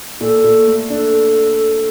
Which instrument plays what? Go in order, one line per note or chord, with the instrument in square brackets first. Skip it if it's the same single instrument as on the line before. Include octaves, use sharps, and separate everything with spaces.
[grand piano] A#2 [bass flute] A4
[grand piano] A#2
A3
[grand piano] D4 [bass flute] A4